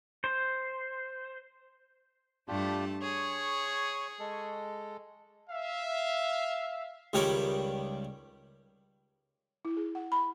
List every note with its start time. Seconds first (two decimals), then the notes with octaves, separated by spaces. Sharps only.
0.24 C5
2.48 G2 A3 D4 F4 G4 A5
3.01 G#4 C#5 C#6
4.19 G#3 A4
5.50 E5 F5
7.13 C#2 D#3 G3 A#4 C#5 B5
9.65 E4
9.77 G#4
9.95 F#5
10.12 B5